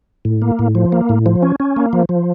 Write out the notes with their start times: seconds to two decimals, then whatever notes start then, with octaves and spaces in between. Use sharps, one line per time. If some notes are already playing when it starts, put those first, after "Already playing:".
0.25 A2
0.42 A#3
0.59 A2
0.75 F3
0.92 A#3
1.09 A2
1.26 F3
1.42 C#4
1.60 C#4
1.76 A#3
1.93 F3
2.09 F3